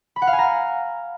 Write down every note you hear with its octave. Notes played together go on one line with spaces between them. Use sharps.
B5
F#5
F5
G#5
A#5